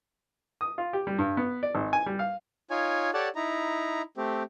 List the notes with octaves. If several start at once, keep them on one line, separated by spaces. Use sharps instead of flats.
D#6
F4
G4
G3
G2
B3
D5
G#1
G#5
G3
F5
D#4 F4 C#5 G#5
G4 A4 C#5 D5 F#5 A5
D#4 E4 A#5
A3 C4 G4